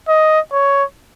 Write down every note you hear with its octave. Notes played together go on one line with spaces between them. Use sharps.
D#5
C#5